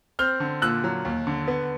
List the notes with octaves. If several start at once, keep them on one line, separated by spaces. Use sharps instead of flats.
C4 F6 G6
D3
A#2 E6 F#6
F#3
D#2
D3
B3